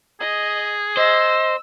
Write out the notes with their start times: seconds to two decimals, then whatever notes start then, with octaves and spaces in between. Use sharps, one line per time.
0.21 G#4 D#5
0.97 C5 D#5 E6